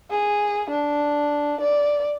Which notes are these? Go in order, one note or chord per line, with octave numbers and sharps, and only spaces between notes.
G#4
D4
D5